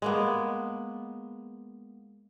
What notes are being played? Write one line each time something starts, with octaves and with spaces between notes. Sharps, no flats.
G#3 A#3 B3